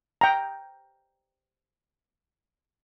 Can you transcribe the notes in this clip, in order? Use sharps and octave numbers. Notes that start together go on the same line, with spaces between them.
G5 A#5